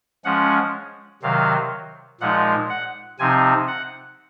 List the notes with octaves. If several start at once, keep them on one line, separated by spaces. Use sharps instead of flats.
F3 G#3 C#4 F#5
C3 D#3 F#3 F5
A#2 F3 G#3 D#4 F#5
F#5
C3 F3 C4 D#4 G#5
F#5